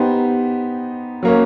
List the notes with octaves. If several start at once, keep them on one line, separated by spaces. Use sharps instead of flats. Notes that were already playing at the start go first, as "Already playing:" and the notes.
Already playing: B3 D#4 G4 C5
F#3 A#3 C#4